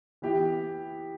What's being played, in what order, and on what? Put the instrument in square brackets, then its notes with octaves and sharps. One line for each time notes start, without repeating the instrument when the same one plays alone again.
[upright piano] E3 B3 E4 G4